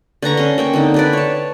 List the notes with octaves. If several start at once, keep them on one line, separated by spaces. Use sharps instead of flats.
D3 B4 A#5 C#6
C#4 C6
A#3 G5 C#6
D3 C4 D#4
D4 B4 D5
C#5 A5